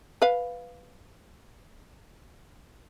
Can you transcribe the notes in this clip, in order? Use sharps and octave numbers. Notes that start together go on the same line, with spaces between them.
B4 F5